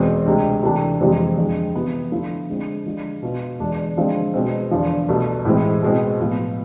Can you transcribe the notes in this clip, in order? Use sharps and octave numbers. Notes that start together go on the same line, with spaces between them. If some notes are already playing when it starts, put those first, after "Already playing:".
Already playing: E2 B2 G#3 C4
D2 C3 G#3
C3 E3 A3 D4
F2 C3 E3 G#3 C4
F2 D3 G#3
C3 E3 B3 E4
D3 F3 A3 E4
D3 G#3 C4
D3 F3 G#3
B2 B3 F4
E2 D3 G#3 D4
D3 F3 G#3 C4 F4
B2 G#3 C4
E2 D3 F3
C2 B2 A3
A2 E3 G#3 C4 E4
B2 G#3 C4
A2 F3 B3